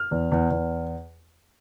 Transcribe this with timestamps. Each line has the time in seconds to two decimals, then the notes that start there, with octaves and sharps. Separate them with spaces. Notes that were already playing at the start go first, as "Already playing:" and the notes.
Already playing: F6
0.11 E2
0.32 E2
0.51 E2